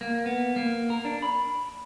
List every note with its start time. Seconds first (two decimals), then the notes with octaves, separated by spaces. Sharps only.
0.01 A#3
0.26 B3
0.56 A#3
0.90 A#4
1.05 D4
1.22 B5